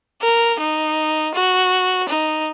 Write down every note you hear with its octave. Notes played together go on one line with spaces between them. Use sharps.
A#4
D#4
F#4
D#4